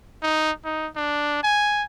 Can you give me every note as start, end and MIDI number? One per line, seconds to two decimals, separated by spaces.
0.23 0.51 63
0.65 0.88 63
0.96 1.43 62
1.43 1.83 80